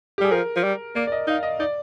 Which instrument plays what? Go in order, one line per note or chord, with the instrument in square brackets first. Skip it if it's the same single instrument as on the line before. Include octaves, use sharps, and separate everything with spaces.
[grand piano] G4
[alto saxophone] G3 [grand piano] G#4
[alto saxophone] F3 [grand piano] A#4
[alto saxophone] F3
G3
[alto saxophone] A#3 [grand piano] D5
[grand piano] D5
D#5
[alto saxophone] D#4 [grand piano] F5
[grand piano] D#5
[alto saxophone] D#4 [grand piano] D5